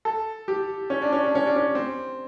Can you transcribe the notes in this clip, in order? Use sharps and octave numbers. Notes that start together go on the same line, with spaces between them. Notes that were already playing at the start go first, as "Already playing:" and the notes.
A4
G4
C#4
D4
C#4
D4
C#4
D4
C#4
C4